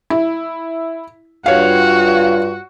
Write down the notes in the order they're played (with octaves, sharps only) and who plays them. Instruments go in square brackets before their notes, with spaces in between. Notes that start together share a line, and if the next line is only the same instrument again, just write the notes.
[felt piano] E4
[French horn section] G2 F4 [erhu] F#4 [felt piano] C#5 F5